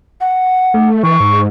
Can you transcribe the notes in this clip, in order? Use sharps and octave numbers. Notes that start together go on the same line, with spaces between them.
F#5
A3
E3 C#6
G#2